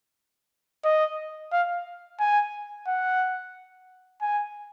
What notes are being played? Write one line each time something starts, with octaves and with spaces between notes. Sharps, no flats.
D#5
F5
G#5
F#5
G#5